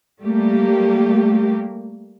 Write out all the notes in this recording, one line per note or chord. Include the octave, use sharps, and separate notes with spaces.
G3 A3 A#3 G4